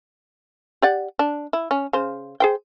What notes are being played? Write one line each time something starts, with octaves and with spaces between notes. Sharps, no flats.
G4 D5 F#5
D4
E4
C#4
C#3 C5
G#4 C5 G5